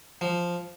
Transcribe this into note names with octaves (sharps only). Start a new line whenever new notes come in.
F3